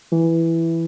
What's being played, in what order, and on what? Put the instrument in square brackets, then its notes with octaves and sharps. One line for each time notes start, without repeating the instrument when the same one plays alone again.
[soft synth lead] E3